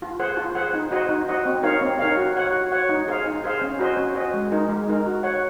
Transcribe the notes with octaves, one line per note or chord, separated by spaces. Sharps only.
F4
G#4 C5 F#5
F4
G#4 C5 F#5
D#4
F#4 C5 D#5 F#5
D#4
F#4 C5 D#5 F#5
C4
D#4 A#4 C#5 F5
C4
D#4 A#4 C#5 F5
F#4
C#5 F#5
F#4
C#5 F#5
D#4
G#4 C5 F5
D#4
G#4 C5 F5
C#4
F#4 C5 D#5
C#4
F#4 C5 D#5
G#3
D#4 A#4
G#3
D#4 A#4
F#4
C#5 F#5